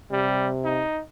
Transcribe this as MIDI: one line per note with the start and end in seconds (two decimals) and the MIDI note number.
0.12 0.83 48
0.12 0.49 55
0.65 1.01 63